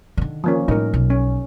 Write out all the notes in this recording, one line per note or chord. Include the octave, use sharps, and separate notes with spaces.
D3 D#3
F3 A#3 C#4
A2 G3 D#4 A#4
B1
C#4